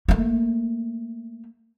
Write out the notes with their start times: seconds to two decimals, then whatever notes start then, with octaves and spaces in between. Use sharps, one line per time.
0.08 A3 A#3